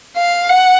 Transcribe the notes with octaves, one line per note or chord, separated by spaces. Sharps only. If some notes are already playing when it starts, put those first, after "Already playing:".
F5
F#5